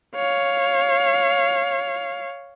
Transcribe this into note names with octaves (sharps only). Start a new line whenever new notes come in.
C#5 F5